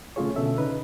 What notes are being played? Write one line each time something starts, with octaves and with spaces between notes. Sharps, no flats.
C#3 A3 C#4 F4 G#4 C#5
B2 D3 C#4 A4 E5
C#3 D#4 B4